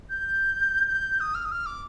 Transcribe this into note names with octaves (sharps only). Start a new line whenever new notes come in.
G6
G6
D#6
F6
D#6
F6
D6